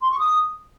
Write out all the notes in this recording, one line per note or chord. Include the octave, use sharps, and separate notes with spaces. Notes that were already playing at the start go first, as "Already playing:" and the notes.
C6
C#6
D#6